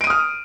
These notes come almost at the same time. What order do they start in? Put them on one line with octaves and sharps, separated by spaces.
D7 D#7 D#6 F6